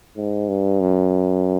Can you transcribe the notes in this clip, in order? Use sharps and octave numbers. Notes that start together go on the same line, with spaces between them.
G#2
G2
F#2